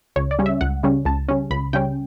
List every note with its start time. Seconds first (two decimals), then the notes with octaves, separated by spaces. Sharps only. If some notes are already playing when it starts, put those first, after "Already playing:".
0.16 C#2 C#5
0.31 D5
0.39 C#3 G3 C#4
0.46 E5
0.61 C#2 F#5
0.83 C#3 G3 C#4
1.05 C#2 A5
1.29 C#3 G3 C#4
1.51 C#2 B5
1.73 C#3 G3 C#4 G5